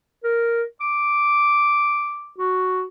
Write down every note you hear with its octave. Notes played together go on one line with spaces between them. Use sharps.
A#4
D6
F#4